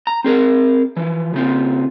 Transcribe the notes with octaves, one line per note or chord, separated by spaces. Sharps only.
A#5
C4 G#4 A#4
E3 F3
C#3 C4 F4